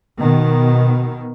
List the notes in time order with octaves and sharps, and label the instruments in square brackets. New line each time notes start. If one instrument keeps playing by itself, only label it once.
[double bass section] B2 D#3